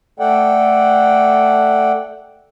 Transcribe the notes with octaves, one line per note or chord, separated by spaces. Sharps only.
A3 A4 D5 F#5 G5